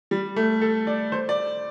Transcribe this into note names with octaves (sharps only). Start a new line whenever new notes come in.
G3
A3
A4
D5
C5
D5